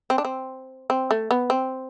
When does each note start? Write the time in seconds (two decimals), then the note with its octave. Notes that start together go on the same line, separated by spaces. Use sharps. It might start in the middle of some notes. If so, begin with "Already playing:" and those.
0.10 C4
0.18 D4
0.25 C4
0.90 C4
1.11 A3
1.31 B3
1.50 C4